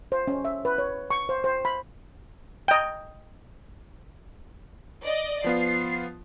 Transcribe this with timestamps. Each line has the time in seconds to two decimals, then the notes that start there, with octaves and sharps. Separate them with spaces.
0.12 C5
0.27 C#4
0.45 E5
0.65 B4
0.78 C#5
1.10 C#6
1.29 C5
1.44 C5
1.65 B5
2.68 D#5 G5
5.03 D5 D#5
5.44 F3 B3 F4 C7